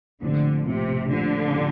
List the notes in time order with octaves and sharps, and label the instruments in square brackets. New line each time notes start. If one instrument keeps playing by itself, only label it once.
[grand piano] A#1 A2 F3 C4 G4 [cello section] D3
[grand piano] A#1 A2 F3 C4 G4 [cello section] C3
[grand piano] A#1 A2 F3 C4 G4 [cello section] D3
[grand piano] A2 F3 C4 G4